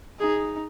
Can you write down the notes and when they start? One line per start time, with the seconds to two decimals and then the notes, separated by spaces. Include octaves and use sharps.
0.20 D#4 G#4